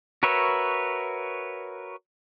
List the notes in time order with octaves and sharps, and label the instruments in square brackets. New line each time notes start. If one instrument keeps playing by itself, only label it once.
[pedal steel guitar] F#4 A#4 B4 C#5 E5